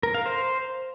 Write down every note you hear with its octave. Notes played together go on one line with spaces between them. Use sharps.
A#4
F5
C5